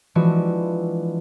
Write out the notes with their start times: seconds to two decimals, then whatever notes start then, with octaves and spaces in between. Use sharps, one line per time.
0.15 E3 F3 G#3 D4 F#4